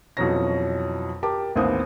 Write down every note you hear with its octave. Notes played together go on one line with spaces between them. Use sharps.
F2 B2 E3 F#3 C#4 A#6
G4 A#4 A5 D6
A1 D#2 B3 C4 D#6